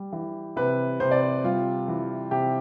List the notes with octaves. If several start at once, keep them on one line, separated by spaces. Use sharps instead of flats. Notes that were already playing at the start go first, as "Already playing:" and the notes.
Already playing: G3
E3
C3 B4
C3 C5
D5
C5
G3 F4
E3
C3 G4